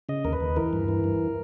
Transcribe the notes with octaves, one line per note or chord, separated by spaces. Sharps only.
C#3 D#5
D#2 A#4
B4
D#2
E3 A#4
G2
E3
G2